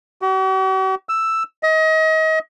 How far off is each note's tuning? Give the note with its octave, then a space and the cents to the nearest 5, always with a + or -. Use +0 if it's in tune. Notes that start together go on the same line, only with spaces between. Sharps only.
F#4 +45
E6 +5
D#5 +30